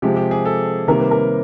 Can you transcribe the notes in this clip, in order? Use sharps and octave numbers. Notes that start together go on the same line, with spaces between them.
C3 F3 G#3 G4
G4
G#4
A4
C3 D#3 G3 A#3 A#4
B4
A#4